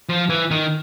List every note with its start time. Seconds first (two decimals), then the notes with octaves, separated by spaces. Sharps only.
0.09 F3
0.29 E3
0.51 D#3